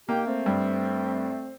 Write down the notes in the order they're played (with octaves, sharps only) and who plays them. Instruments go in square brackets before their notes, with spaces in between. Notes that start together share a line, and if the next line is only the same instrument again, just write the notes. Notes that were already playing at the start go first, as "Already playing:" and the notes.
[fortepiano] A#3 [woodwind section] D#4 G4 G5
[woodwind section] A3 C4
[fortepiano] G2